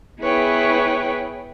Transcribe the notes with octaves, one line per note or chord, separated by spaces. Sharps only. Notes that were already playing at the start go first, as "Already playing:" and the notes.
B3 E4 G#4 B4 C#5 G5